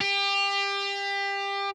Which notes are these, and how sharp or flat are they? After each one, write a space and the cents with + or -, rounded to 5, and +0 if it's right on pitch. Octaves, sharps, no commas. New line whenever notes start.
G4 +25